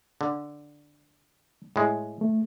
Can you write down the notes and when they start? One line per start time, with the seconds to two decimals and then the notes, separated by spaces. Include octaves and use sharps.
0.21 D3
1.76 A2 G#3
2.21 A3